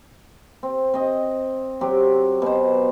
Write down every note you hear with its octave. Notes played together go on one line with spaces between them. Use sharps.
C4
C4 D#5
F#3 C4 G4
B2 C5